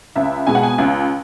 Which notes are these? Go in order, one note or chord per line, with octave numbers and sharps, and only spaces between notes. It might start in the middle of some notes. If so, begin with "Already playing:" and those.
C#2 E5
B2 G#3 B3 G#5
F#5
G#5
C#2